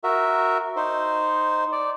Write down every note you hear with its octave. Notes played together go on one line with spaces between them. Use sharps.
F#4 A#4 E5
D#4 C5
D5